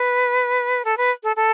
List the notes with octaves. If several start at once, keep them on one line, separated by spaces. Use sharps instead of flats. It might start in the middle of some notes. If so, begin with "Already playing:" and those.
Already playing: B4
A4
B4
A4
A4